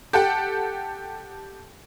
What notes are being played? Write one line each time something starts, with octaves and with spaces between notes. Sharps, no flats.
G4 A4 F#5 G5